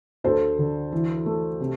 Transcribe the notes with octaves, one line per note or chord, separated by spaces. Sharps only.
D2 A4 C5
D3
E3
A3
C3